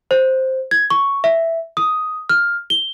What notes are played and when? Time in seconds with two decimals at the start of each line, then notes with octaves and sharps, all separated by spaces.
0.11 C5
0.71 G#6
0.90 C#6
1.24 E5
1.77 D#6
2.29 F6
2.70 G7